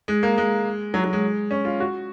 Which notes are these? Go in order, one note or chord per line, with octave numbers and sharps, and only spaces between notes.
G#3
A#3
G#3
F#3
F#3
G#3
C#4
F4
F#4